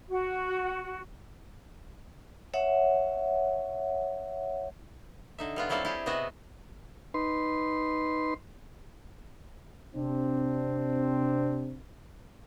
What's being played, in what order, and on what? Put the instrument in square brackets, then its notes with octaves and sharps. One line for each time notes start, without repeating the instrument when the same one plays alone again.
[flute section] F#4
[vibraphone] C#5 E5 F#5
[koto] D3 D#4 E5
G3 B3 F4
F#3 C4 E4 A4 D5 F5
E4 G4 G#4
C3 B3 F#4 B4 D#5 E5
[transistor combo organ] D#4 B4 C6
[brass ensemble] C3 C4 D4